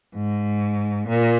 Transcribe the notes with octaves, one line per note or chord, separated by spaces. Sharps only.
G#2
A#2